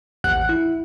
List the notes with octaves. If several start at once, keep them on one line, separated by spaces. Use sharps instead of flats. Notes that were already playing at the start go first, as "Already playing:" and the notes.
A1 D#2 F#5 F#6
E4